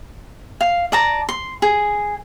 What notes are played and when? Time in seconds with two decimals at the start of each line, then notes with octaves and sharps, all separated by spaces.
0.61 F5
0.92 D5 A5 A#5
1.29 C6
1.62 G#4